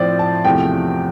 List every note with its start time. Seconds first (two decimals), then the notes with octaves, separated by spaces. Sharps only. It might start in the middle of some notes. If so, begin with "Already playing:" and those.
Already playing: A2 F3 C4 C5 D5
0.19 A5
0.45 E2 C3 F3 A3 G5